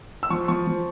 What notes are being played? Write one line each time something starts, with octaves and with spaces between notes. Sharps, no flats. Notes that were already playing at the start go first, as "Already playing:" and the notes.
E6
F3 C#6
F3 C#6
F3